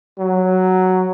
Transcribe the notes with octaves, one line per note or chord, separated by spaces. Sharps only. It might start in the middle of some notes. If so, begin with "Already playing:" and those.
F#3